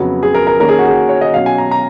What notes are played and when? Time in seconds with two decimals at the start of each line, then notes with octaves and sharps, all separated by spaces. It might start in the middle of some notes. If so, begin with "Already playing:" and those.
Already playing: F2 C#3 F#3 B3
0.23 G#4
0.34 A#4
0.47 A#4
0.60 D#3 A#3 C#4 A#4
0.69 G#4
0.79 F#4
0.87 G#4
1.09 C#5
1.21 D#5
1.34 B2 F#3 C#4 F5
1.46 G#5
1.58 A#5
1.71 A#5